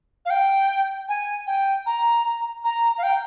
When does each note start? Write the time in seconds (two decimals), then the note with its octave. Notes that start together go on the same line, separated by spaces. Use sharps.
0.25 F5
0.30 G5
1.09 G#5
1.47 G5
1.86 A#5
2.64 A#5
2.98 F5
3.03 G5